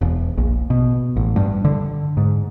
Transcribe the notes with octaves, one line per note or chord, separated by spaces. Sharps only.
E1
A#1
B2
A1
G2
D3
G#2